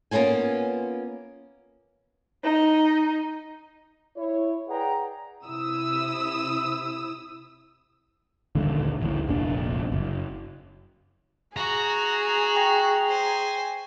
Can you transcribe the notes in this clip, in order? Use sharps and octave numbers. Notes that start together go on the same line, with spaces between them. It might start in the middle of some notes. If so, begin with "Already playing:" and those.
A#3 B3 C#4 F4 G#5
D#4
E4 C#5
G#4 B4 D5 F#5 G5 A#5
C3 E4 D#6 E6
D#1 A1 D2 D3
A1 D2 A2
F1 A#1 D4
F#1
F#4 G#4 A#5
G5 C#6 A#6
C5 G#5